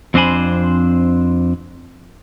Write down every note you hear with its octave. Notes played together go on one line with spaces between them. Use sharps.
F2 C4 D4 C5 G#5 B5